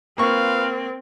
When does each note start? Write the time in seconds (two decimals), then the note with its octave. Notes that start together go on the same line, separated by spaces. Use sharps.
0.18 A#3 C4 F4 B4 F5 C#6